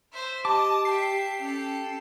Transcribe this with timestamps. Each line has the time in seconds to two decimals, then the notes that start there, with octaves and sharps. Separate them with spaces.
0.12 C5 E5
0.45 G4 D#5 A5 D6
0.85 E5 G5 C7
1.40 C#4 G4 A4